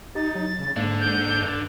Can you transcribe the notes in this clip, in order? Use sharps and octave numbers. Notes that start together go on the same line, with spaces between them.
D#4 G4 A6
F#3
C#3
G#2 D3 A#3 D4
G6
G2